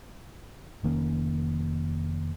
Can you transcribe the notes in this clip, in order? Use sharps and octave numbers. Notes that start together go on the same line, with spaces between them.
F1 D#3 A#3 C#4